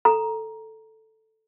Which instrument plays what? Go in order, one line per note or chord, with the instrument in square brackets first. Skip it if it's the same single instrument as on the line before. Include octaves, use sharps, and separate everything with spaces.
[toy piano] A4 A#5